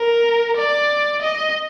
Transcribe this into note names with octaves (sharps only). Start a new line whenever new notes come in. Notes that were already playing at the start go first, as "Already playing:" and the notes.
Already playing: A#4
D5
D#5